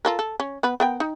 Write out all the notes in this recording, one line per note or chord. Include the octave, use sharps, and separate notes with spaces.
F4 A4 A#4
A4
C#4
B3 B4
B3 A#4 G5
D#4